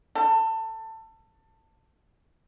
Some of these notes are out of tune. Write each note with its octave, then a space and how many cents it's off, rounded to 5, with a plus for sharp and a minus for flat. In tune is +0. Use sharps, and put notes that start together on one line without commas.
A4 +20